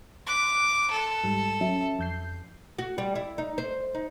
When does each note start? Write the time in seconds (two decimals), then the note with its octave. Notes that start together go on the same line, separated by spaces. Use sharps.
0.27 C6 D6 F#6 B6
0.91 A4
1.24 G#2 G3
1.61 F#3 C#4 E5
1.99 F2 G6 C7
2.78 F#4
2.98 G3
3.15 E4
3.38 D#4
3.58 C5
3.95 D#4